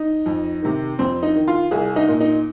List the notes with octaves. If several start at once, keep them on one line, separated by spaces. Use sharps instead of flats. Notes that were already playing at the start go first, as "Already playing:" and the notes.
Already playing: D#4
F2
C3 D#3
F2 C4
D#4
D#3
F4
C2 G#4
D#4
A#2
D#4